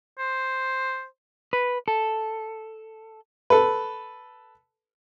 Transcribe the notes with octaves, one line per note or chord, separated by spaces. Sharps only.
C5
B4
A4
A4 B4